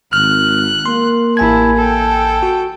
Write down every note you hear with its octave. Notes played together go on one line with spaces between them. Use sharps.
G#1 F6 F#6
A#3 C6
A1 E4 G#5 A5 G#6
A4 G5
F#4